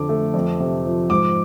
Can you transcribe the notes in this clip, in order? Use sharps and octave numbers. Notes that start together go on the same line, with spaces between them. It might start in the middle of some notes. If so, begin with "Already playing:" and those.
Already playing: F2 D3 D6
A3
F2
C3
F3
G#2 D6